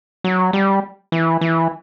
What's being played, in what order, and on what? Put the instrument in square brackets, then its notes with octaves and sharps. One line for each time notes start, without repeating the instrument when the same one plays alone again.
[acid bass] F#3
G3
E3
E3